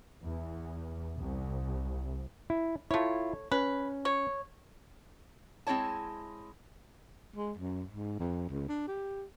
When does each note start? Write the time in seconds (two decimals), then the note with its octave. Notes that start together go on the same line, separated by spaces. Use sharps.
0.22 E2
1.18 C2
2.50 E4
2.91 A3 E4 F4 C#5
3.52 C#4 B4
4.05 C#5
5.67 G#3 C4 E4 C#5 A5
7.36 G#3
7.57 F#2
7.91 G#2
8.19 F2
8.49 C#2
8.69 D4
8.88 G4